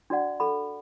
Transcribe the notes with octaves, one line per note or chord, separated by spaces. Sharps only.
D4 F#4 D5 F#5
A4 F#5 B5